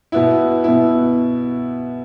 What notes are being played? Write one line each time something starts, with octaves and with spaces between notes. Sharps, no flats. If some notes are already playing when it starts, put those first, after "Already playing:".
B2 B3 E4
B2 B3 E4